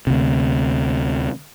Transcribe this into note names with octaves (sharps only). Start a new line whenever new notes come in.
D2 C3